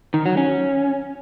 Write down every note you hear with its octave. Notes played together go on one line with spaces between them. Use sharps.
D#3
F#3
C#4